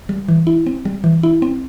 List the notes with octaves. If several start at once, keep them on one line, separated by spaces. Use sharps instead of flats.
G3
E3
E4
C4
G3
E3
E4
C4